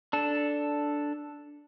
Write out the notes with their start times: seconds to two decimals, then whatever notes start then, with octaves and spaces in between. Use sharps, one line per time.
0.13 D4 A4